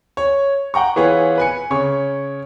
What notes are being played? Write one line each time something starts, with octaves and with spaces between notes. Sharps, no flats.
C#5
F#5 G5 A#5 C#6
E3 B3 F4 G#4 B4 C#5
B4 G#5 C#7
C#3 C#5 C#6